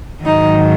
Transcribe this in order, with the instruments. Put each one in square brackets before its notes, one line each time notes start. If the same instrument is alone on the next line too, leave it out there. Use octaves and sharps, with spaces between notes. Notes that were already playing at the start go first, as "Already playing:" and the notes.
[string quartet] G#2 D#3 F#3 D#4